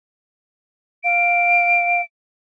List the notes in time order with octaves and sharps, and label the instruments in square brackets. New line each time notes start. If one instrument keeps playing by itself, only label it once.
[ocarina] F5 [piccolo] D7